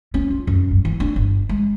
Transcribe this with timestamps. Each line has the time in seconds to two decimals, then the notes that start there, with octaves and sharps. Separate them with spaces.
0.14 C#4
0.30 F4
0.47 F#2
0.71 G2
0.85 E3
1.00 D4
1.16 G1
1.49 G#3